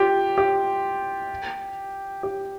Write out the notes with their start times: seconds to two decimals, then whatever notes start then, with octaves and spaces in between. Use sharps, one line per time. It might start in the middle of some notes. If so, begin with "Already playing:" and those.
Already playing: F4 G4
0.38 G4
2.23 G4